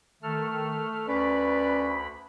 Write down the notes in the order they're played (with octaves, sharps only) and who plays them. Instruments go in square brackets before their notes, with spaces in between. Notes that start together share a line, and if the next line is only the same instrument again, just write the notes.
[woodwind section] D#3 [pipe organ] A3 A4 F6
[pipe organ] D2 B5 [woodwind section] C#4 B4 D5